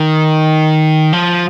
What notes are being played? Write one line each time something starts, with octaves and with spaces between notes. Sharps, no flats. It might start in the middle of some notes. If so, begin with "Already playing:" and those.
Already playing: D#3
F3